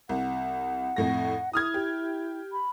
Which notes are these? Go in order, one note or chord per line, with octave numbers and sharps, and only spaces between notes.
C2 F#5
F2 A2 A#6
E4 D#6 F6 G#6
G4
B5